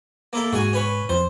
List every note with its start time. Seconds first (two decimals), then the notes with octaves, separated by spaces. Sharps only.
0.33 A#3 E4 A4
0.53 G#2 F#4 G#4 G#5
0.73 C#4 B4 C#5
1.09 F2 C5